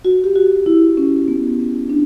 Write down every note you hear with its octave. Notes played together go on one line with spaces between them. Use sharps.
F#4
G4
F#4
E4
C#4
B3
C#4
D4